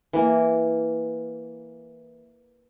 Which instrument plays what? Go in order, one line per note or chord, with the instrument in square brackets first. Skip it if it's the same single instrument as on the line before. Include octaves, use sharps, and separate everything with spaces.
[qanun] E3 A#3